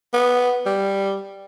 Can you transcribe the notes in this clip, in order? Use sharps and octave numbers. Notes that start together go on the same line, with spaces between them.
B3
G3